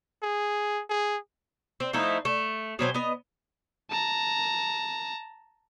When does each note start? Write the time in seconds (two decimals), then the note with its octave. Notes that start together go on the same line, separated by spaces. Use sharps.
0.22 G#4
0.90 G#4
1.80 C4
1.93 F3 A3 D#4 E4
2.25 A3
2.79 B2 F#3 C4 G#5
2.94 B3 D#5
3.90 A5 A#5